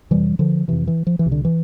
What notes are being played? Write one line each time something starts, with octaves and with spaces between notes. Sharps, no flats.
F2 C3 E3 G3
D3 F3
F2 C3 E3
E3
F3
E3
C2 C3
D3
E3